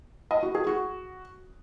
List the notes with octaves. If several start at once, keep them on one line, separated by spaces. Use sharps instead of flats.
D#5
F#4
G#4
F#4